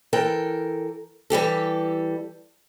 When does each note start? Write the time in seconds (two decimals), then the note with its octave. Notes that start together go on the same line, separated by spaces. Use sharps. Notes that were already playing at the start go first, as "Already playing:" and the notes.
0.13 E3 A4 A#4 G5
1.30 E3 G3 G4 A4